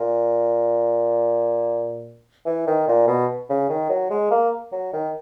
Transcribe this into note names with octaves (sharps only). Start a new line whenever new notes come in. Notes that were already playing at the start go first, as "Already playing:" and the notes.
Already playing: A#2
E3
D#3
A#2
B2
C#3
D#3
F#3
G#3
A#3
F#3
D#3